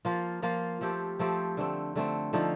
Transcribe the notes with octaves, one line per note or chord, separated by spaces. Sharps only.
F3 A#3 F4
F3 A#3 F4
F3 A3 C4 G4
F3 A3 C4 G4
D3 A3 C4
D3 A3 C4
D3 F3 A3 D#4